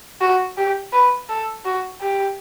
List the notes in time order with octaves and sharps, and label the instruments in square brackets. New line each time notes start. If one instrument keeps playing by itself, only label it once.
[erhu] F#4
G4
B4
A4
F#4
G4